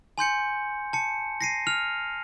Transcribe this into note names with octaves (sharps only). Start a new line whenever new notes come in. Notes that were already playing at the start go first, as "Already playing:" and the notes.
G#5 C6 G6 C#7
A5 C#7
A#6 C7 D#7
F6 F7